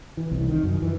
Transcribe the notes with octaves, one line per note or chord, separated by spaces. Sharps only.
E3
C2
D#3
F#2
E3